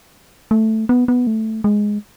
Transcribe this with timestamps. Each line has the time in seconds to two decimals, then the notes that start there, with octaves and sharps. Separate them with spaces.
0.51 A3
0.89 B3
1.08 B3
1.27 A3
1.64 G#3